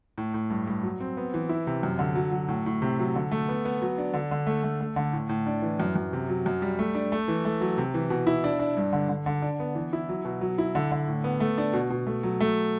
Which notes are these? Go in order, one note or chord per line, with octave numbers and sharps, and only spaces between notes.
A2
A2
G2
G2
F#3
C4
B3
E3
E4
C3
F#2
D3
F#3
F#3
A2
A2
C3
F#3
D3
A3
B3
B3
F#3
D4
D3
D3
A3
A3
A3
D3
A2
A2
D4
E3
F#2
F#2
C3
F#3
F#2
G3
A3
D4
A3
E3
A3
F#3
C3
E3
B2
E4
D4
D4
G2
D3
D3
D3
D4
B3
E3
E4
F#3
B2
F#3
E4
D3
D3
A2
B3
A3
D4
B2
B2
A3
F#3
A3